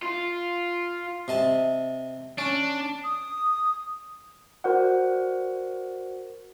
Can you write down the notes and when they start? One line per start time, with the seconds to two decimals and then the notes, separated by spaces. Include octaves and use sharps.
0.03 F4
1.28 C3 D#5 A5
2.38 C#4 D4
3.04 D#6
4.64 F#4 A#4 C5 D5 F#5